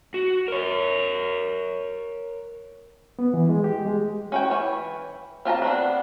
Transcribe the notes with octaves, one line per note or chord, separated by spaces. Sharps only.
F#4
A#4 C#5
B3
E3
G#3
G4
G#3
C#4 F#4 G5
E3 C#5
C4 F4 A5 A#5
B3 C4 D4